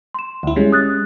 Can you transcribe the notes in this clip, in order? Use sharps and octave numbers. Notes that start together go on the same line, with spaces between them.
C6 E7
D2 E4
G3 G#3 C#4
D#6 F#6 A6